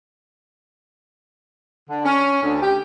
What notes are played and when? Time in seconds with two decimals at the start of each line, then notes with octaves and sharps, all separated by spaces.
1.89 D3
2.04 C#4
2.42 D2
2.62 G4